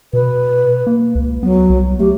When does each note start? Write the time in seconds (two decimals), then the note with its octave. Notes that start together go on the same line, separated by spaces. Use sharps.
0.13 B2 B4
0.87 A#3
1.15 C#2
1.43 F#3 B3
1.70 C2
2.00 A3 G4